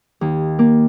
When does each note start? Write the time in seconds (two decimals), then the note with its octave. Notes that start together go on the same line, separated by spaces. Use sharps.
0.21 D#2
0.59 A#3